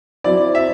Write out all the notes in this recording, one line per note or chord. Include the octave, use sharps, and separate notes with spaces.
F#3 C4 E4 D5
E5